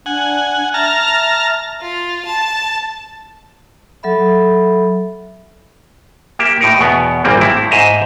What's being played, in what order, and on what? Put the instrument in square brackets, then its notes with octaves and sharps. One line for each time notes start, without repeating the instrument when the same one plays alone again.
[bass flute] D4 [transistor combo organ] F#5 G#5
[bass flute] E5 [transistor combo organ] A5 A#5 F6
[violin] F4
A5
[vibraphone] F#3 A4 E5 B5
[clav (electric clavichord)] A#3 G4 E5
A2 D#4 A#4
E2 B2 B3
G#1 A#2 G3 A#3 C4
A2 C4 E4
G#2 C5 D#5 E5 A#5